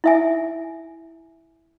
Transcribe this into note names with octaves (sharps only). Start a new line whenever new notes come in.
E4 E5 G#5